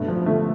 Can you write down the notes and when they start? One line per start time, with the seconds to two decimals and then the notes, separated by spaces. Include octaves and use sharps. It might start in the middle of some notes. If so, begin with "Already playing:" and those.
Already playing: G2 B2 A3
0.08 F3
0.26 D3 A3